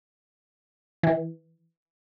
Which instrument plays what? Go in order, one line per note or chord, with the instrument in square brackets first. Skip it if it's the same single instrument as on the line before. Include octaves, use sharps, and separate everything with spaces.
[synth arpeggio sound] E3